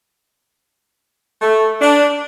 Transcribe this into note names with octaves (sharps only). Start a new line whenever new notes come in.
A3
D4